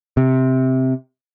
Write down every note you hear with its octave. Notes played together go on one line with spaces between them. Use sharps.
C3